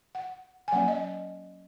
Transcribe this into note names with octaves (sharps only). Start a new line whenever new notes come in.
F#5
G#5
F#3 A#3 C#4 F#5
D#5